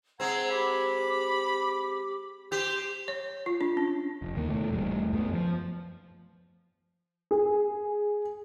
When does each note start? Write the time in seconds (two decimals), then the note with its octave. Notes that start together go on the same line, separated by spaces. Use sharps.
0.20 G#3 C4 F#5 A#5 G#6
0.50 G4 B5 D6
2.52 G4 C5
3.08 C#5
3.46 F4
3.61 D4
3.77 C#4
4.22 F1
4.36 D#2 A#3
4.49 B2 A3
4.71 E1 G#2 G3 A3
5.13 F#2 A3 B3
5.33 F3
7.31 G#4